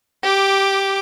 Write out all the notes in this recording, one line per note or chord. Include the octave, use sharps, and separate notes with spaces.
G4 D6